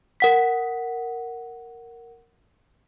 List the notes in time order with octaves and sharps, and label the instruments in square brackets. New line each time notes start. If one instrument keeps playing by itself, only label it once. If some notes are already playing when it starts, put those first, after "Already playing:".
[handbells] A#4 F#5 B6